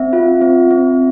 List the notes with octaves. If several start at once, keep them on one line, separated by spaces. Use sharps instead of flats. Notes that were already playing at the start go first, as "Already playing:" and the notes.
Already playing: C4 E5
F4
C4
C4